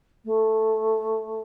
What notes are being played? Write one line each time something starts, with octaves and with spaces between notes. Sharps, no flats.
A3